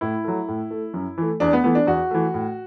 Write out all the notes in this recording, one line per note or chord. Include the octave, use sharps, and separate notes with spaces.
A2 E4
F#3 A3
A2
A3
F#2
E3 A3
E2 D4
B3
E3 A3 B3
D4
E2 F#4
E3 A3
A2